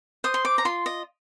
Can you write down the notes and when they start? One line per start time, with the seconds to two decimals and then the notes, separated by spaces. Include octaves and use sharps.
0.24 C5 D#6
0.34 C6
0.45 D6
0.58 A#5
0.65 F4 C6
0.86 D#5